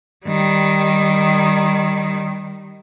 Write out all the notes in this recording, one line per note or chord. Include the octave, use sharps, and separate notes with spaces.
D#3 G3